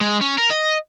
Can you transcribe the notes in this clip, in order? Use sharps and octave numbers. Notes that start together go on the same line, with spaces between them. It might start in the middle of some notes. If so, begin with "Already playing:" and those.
G#3
C#4
A#4
D#5